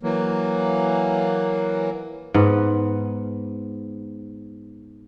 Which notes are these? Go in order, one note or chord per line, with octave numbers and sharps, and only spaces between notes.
E3 F#3 A#3
G#2 B3